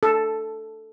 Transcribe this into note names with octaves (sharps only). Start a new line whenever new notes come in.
A4